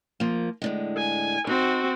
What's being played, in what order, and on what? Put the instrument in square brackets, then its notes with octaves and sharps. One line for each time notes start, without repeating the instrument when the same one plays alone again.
[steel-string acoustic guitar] F3 A#3
A2 D3 G#3
[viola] G#5
[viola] C4 F#4 [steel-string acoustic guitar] D#4